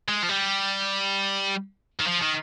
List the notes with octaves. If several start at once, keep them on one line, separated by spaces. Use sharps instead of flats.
G#3
F3
G3
D#3
F3
D#3